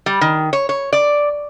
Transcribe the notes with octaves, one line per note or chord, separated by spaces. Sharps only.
G3
D#3
C#5
C#5
D5